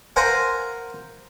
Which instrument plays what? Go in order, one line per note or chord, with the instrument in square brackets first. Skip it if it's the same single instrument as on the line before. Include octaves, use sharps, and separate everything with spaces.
[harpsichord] A#4 C5 F5 F#5 G#5 A#5